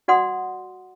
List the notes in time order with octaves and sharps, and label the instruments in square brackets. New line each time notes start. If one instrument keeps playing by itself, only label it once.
[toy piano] F#4 D5 F#5 C6 D#6